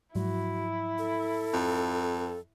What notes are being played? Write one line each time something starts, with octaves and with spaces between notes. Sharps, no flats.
G#2 F3 F#3 E4 F#4
A4
F2